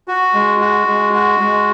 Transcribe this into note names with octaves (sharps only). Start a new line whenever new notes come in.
F#4
G#3
F#4
G#3
F#4
G#3